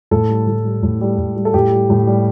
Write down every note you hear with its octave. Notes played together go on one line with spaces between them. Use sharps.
A2 A4
G3
A2
G3
A2
G3
A2
G3
A4
A2 G4
G3
A2
G3